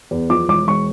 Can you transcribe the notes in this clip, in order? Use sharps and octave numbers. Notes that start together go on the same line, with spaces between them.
E2
F3 D6
E1 D6
E1 C#6